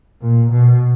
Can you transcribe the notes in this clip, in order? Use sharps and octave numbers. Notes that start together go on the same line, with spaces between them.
A#2
B2